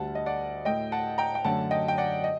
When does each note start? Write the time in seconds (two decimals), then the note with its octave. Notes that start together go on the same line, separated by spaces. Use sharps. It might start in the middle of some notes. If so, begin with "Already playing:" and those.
Already playing: D2 D3 G3 F#5 A5
0.15 D#5
0.26 D5 F#5
0.65 A2 A3 D#5 G5
0.92 F#5 A5
1.18 G5 A#5
1.35 G5
1.45 F#2 D3 F#3 A3 F#5 A5
1.71 D#5 G5
1.88 G5
1.98 D5 F#5
2.24 D#5